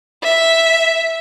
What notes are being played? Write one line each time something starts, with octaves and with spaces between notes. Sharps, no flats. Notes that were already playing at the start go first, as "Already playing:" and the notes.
E5